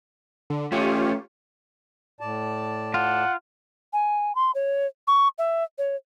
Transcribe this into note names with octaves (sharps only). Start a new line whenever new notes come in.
D3
A3 C#4 F4 G4 C#5
A2 D5 A5
F4 F#5
G#5
C6
C#5
C#6
E5
C#5